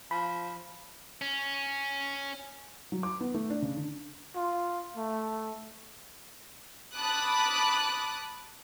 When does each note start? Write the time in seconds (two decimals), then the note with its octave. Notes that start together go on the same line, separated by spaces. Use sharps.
0.11 F3 B5
1.22 C#4
2.92 F#3
3.03 D6
3.21 B3
3.34 A3
3.50 D4
3.62 C#3
3.77 D3
4.36 F4
4.97 A3
6.95 A5 B5 D6 D#6 F#6